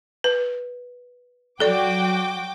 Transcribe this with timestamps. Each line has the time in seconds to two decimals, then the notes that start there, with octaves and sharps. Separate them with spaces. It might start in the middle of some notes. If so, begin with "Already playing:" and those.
0.24 B4
1.60 F#3 F#4 A4 D5 G5 D6